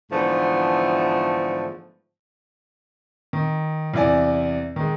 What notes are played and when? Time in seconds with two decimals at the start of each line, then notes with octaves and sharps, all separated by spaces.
0.12 G#2 D3 E3 F3 A3 B3
3.33 D#3
3.94 E2 C3 E4 D5 G#5
4.76 D#3 G#3